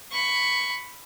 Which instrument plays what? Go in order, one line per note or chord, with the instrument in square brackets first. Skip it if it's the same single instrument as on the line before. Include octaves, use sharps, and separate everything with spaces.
[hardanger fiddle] B5 C#6